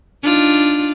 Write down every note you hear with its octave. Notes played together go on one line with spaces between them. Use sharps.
D4 D#4 F4